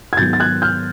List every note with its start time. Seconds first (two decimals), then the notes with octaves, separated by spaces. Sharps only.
0.13 G#6
0.17 G#2 D#3 F#3 B3 G6 A6
0.33 A6
0.40 F#6 G#6
0.62 F6 G6